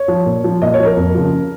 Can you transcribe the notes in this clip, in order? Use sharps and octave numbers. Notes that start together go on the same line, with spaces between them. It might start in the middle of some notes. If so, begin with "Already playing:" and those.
Already playing: C#5
F3
A#2
F3
A#2 D#5
C#5
F3
A#4
F2
C#3 F3